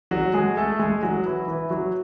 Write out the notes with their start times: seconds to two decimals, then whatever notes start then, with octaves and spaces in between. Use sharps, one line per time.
0.11 F#3 F#4
0.34 G#3 G#4
0.57 A3 A4
0.79 G#3 G#4
1.03 F#3 F#4
1.25 E3 E4
1.48 E3 E4
1.70 F#3 F#4